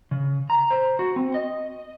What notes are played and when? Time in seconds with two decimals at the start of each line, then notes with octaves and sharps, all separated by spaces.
0.11 C#3
0.50 A#5
0.71 C5
0.99 F#4
1.16 C4
1.34 D#5